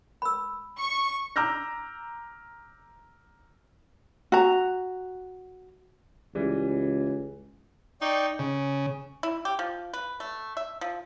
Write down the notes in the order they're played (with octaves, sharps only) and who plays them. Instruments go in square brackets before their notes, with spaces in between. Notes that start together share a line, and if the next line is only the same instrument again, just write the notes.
[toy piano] B5 E6
[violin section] C#6
[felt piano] A#5 D6 E6 F6 G6 A#6
[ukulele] F#4 A#5
[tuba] C#2 [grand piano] E3 G3
[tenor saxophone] D#4 [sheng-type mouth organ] D5 G5 C#6
[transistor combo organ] C#3
[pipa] E4
G4
F3
B4
A3
E5
F3